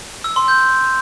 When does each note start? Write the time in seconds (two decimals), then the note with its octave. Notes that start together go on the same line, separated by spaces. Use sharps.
0.24 E6
0.36 C6
0.48 G6